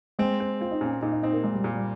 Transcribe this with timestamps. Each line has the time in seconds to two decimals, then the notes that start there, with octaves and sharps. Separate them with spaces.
0.19 G#3 C4
0.40 C4
0.61 C4 F4
0.71 D#4
0.81 A#2 C#4
1.02 A#2 D#4
1.12 D#4
1.23 C4 D#4
1.33 A#3
1.43 A#2 G#3
1.54 G3
1.64 A#2
1.75 G3